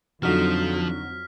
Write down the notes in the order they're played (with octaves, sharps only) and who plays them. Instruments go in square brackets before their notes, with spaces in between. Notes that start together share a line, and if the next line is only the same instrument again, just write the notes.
[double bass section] F2 F#3 [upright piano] D3 D#4 F#4 [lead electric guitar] F3 [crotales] F6 B6